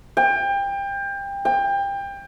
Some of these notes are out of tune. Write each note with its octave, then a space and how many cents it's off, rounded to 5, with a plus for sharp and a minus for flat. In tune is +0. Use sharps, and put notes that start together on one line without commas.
G5 +25
G5 +25